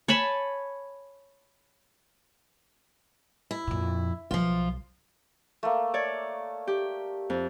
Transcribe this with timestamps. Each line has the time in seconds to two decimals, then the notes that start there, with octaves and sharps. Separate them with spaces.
0.08 C#5 G#5 A5 B5
3.51 E4
3.67 F2 A#2
4.31 B1 F3 F4
5.63 A3 A#3
5.94 C#5 D5
6.67 G4
7.30 F2